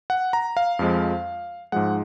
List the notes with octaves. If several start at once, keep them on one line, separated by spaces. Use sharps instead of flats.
F#5
A#5
F5
F2 F3 G#3
G#2 F3 G#3 F#5